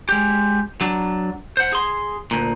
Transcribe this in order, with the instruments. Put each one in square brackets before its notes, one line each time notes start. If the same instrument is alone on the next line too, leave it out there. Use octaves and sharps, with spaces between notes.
[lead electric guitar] G#3 G4
F#3 D4
C5 F#5
G#4 C6
D2 A#2